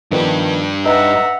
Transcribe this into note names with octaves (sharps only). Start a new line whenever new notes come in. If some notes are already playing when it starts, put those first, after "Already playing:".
G2 D#3 F3 B3 D4
D#4 B4 E5 F#5 A#5